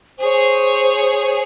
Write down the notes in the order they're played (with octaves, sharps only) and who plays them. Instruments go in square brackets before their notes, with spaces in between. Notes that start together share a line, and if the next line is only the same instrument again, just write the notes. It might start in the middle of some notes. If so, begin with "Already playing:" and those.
[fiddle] G#4 C#5 [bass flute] C5